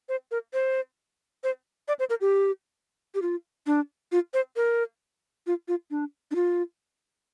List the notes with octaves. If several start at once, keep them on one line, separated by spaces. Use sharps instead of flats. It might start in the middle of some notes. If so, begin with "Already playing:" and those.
C5
A#4
C5
C5
D5
C5
A#4
G4
G4
F4
D4
F4
C5
A#4
F4
F4
D4
D4
F4